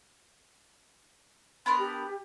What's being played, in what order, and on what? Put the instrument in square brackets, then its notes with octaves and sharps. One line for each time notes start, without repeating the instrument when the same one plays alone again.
[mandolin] B3 D4 A#4 [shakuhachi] C6
[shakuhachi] G4